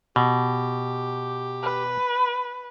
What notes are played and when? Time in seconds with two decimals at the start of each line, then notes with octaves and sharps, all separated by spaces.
0.16 B2 G4
1.62 B4